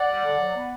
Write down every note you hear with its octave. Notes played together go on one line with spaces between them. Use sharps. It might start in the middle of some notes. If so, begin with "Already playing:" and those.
Already playing: D5 F#5
G3
D3
F#3
B3